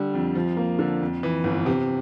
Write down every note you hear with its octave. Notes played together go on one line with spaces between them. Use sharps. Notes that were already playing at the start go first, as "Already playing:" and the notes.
Already playing: D3 G3
F2
F3
A#3
D3
F2
E3
G1
C3